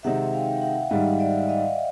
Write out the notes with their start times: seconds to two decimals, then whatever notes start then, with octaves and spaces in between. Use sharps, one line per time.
0.03 C3 D#3 G#3 C4 D#4 E5 F#5
0.33 F5 G5
0.61 E5 F#5
0.90 G#2 D#3 G3 D#5 F5
1.20 D5 E5
1.48 D#5 F5